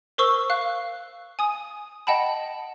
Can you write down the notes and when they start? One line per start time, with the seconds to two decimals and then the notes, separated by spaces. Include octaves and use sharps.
0.18 A#4 C5 C#6 E6
0.50 F5 F#6
1.39 G#5 D#6
2.07 D#5 F#5 G5 A5 B5